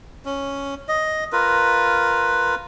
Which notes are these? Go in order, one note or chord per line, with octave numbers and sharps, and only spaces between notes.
C#4
D#5
F4 A#4 B4